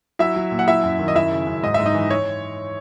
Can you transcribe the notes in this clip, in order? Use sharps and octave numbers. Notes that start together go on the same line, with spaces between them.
F#3 E4 E5
F#3
A#2
F#5
F#3 E4 E5
F#2
D#3
D#5
F#2 E4 E5
C#3
F#2
G#2 D#5
E5
G#2
D#4 D#5
E3
C#5